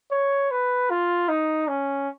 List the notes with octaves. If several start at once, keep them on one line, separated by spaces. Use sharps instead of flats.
C#5
B4
F4
D#4
C#4